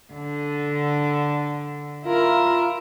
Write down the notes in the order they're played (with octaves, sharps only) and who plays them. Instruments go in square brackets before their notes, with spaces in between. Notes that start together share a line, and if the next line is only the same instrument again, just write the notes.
[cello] D3
[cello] E4 A#4 [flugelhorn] F4